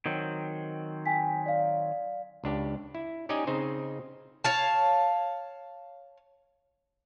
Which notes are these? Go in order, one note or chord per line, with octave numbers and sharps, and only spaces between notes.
D#3 F#3 C4
G5 G#5 B6
D5 F5
C#2 D4 G4
E4
C#4 D#4 G4 D5 D#5 G#5
C#3 C4 D#4 C5
C#5 F5 A5